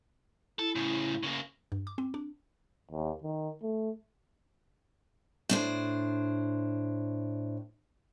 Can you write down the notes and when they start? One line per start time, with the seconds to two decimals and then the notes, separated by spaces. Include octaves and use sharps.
0.59 E4 A4
0.76 A2 C#3
1.23 C#3 A#3
1.72 G2
1.87 D6
1.98 C4
2.14 D4
2.91 D#2
3.23 D#3
3.62 A3
5.49 A2 D4 C5